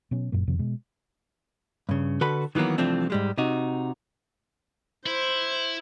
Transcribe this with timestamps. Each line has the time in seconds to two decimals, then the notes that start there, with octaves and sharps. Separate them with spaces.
0.11 B2 F#3 B3 C#4
0.32 F#1 F#2 A#2 A#3
0.47 F2 C3 D#3 F3
0.59 B2 G#3
1.89 G2 C#3
2.21 D3 F#4 A4 B4 B5
2.55 D#3 E3 F#3 A#3 B3
2.78 C2 E3 F3 A3 C4 D4
3.10 G#2 G3 G#3
3.38 C3 D#4 F#4
5.06 E4 C5